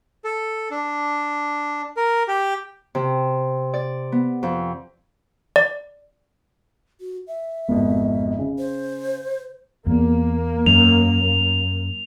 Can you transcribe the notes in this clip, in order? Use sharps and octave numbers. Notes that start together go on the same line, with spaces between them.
A4
D4
A#4
G4
C3
D5
B3
F2
D5
F#4
E5
G#1 F2 B2
C#3
C5
E2 A#3 B3
F#2 F7